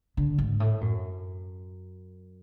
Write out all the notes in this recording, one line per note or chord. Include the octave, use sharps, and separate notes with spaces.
D3
G#2
A2
F#2